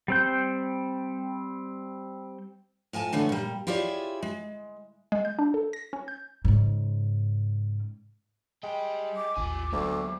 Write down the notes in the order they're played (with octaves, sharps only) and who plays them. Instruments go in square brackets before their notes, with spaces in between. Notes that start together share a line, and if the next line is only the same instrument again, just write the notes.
[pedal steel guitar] G3 C4 G6
[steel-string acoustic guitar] A2 F3 G#5 A5
D3 E3 A3 B3 C#4
A#2 G3
E4 F4 G4 G#4 C#5 D5
G#3
[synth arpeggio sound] G#3
G6
D4
A4
A#6
C#4
G6
[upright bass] G#2 C#3
[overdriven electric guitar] G3 G5 [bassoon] G#3
[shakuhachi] D6
[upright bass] A1 D#2 [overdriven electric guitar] F4 G#5
[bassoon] D2 [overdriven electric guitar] F#3 G#3 [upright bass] B3